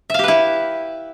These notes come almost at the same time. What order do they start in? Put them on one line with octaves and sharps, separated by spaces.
E5 F5 G4 B4 E4